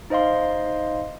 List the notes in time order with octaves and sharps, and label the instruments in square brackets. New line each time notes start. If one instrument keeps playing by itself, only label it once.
[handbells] D#4 C5 D#5 F5 C6